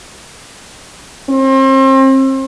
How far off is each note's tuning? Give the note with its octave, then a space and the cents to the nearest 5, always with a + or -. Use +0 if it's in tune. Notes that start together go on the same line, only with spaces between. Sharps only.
C4 +35